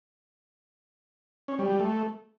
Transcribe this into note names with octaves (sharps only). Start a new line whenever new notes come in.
C#4
G3
G3
A3